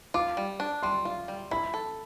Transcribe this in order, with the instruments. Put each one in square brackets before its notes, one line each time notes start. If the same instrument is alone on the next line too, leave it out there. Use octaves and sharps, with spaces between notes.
[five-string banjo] F4 [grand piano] D6
[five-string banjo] G3
D4
[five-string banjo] G3 [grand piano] C6
[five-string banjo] F4
G3
[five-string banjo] E4 [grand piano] B5
[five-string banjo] A4